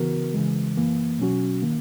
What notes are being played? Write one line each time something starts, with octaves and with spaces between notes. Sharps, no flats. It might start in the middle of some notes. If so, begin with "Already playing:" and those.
Already playing: C#3 E3 B3 F#4 A#4
C#3 E3 G#3
F#2 E3 A#3
B2 F#3 C#4 F#4
D#3 A#3